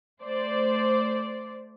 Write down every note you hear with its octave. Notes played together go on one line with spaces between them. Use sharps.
A3 C5 D5